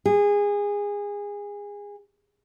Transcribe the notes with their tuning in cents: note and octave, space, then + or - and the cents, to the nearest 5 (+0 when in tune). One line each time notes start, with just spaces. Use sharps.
G#4 -25